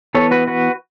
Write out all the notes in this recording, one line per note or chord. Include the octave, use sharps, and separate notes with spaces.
E3 B3 A4 C#5
F#4 B4
F#4 B4